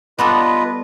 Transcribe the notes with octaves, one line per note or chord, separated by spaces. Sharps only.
G3 B3 F4 A4 B4 D#5